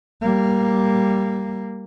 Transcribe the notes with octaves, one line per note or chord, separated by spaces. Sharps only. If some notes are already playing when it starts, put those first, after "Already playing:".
G3 A#3